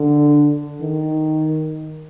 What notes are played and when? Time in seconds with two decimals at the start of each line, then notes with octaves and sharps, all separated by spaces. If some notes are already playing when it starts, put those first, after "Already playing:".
Already playing: D3
0.81 D#3